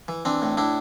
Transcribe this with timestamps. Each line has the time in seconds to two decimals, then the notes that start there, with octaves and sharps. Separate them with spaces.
0.08 E3
0.25 E3 C4 D4
0.42 A2
0.57 A2 D4 E4